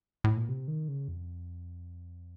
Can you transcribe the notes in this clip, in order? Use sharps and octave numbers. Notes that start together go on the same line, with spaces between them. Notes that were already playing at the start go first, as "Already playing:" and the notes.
A2
A#2
C3
D#3
C#3
F2